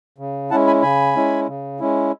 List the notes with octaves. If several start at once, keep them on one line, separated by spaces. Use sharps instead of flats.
C#3
G#3 C#4 E4 F#5 A5
G#5 B5
C#3 G#5 B5
G#3 C#4 E4
C#3
G#3 C#4 E4